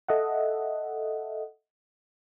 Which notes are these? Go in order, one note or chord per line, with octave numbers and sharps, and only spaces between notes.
A4 D#5 E5 F#5